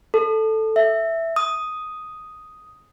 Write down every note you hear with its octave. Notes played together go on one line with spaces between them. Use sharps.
A4
E5
D#6